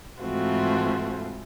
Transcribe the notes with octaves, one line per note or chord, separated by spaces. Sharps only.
G#2 E3 A3 C4 F4 F#4